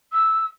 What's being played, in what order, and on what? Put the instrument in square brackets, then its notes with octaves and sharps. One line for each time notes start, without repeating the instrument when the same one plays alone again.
[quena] E6